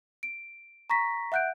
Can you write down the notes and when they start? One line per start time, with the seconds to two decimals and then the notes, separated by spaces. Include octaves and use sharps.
0.23 D7
0.90 A#5 C#6 A#6 B6
1.32 E5 F#5 F#6 G6 D7